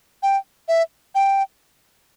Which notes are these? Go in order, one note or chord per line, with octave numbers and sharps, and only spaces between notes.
G5
E5
G5